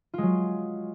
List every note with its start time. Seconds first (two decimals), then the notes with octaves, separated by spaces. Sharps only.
0.14 F4
0.18 G#3
0.23 F#3